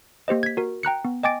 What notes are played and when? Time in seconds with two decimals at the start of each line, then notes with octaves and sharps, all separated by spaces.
0.28 A#3 G4 C5 D#5
0.43 G#6 B6
0.57 F#4 A#4
0.83 G5 A#5 F#6 C#7
1.05 B3
1.23 D#5 G5 G#5 D6 A6 D7